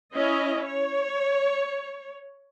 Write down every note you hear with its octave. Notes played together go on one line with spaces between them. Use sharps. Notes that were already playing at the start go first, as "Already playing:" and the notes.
C#4 E4 D#5
C#5